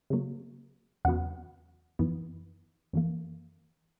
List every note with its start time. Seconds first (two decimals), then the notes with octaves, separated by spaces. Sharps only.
0.10 C#3 F#3 A#3
1.05 E2 C#3 F#3 B3 F#5
1.99 F#2 E3 B3
2.93 F#2 E3 A#3